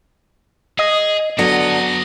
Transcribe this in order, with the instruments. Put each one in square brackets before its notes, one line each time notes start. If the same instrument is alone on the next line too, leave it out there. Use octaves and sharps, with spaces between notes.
[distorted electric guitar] G#4 [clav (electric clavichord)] D#5
[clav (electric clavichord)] D3 [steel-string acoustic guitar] F#3 B3 [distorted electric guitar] D4 A#5 [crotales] D#6 A#6 C#7